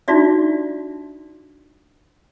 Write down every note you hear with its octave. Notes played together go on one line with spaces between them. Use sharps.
D4 D#4 F4 F#4 D5 E5